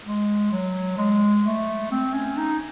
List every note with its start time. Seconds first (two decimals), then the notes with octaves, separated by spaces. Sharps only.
0.05 G#3
0.52 F#3
0.98 G#3
1.45 A3
1.91 C4
2.14 C#4
2.37 D#4